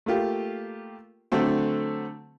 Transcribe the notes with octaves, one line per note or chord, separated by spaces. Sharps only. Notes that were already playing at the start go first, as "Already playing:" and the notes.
A3 A#3 F4 G4
D3 F#3 A3 C4